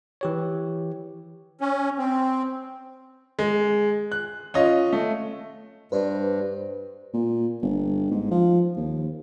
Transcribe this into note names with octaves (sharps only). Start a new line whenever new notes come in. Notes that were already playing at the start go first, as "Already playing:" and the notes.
E3 G4 C#5
C#4
C4
G#3
F#6
C#4 F4 D#5
A3
G2 B4 C5 D5
A#2
G1
G#2
F3
D#2